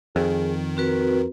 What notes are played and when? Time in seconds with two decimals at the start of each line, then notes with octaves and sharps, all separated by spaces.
0.16 F2 D#3 G#4
0.77 C4 F#4 A#4 B4